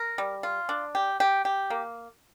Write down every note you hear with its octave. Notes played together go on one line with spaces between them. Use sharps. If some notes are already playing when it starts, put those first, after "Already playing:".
Already playing: A#4
G3
F4
D4
G4
G4
G4
A#3